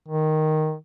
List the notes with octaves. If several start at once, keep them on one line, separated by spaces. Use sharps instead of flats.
D#3